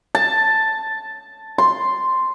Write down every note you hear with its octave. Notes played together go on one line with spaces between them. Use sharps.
A5
C6